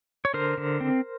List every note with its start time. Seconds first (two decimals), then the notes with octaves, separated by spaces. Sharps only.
0.25 C#5
0.34 D3 A#4 C5
0.58 D3
0.81 C4